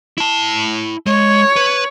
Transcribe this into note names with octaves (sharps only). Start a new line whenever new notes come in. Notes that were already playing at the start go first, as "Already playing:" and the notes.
E4 A5
G#3 C#5
B4